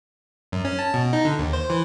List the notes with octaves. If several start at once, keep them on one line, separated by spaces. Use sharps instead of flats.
F#2
C#4
A5
B2
D#4
D3
D#2
C5
E3